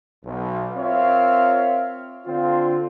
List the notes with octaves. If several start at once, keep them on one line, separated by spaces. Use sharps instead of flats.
B1
C4 F4 A#4 C#5 E5 F5
D3 C4 F4